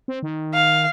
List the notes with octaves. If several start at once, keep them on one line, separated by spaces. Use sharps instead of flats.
C4
D#3
F5